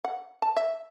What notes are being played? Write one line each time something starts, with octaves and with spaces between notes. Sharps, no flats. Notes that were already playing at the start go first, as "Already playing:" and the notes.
F#5
A5
E5